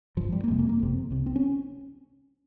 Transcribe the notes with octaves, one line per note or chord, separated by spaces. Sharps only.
G#1 G2 F3
G3
A#3
G1 F2 C3 G#3
A#3
A#3
G1 F2 C3
C2 C3
C4
C#4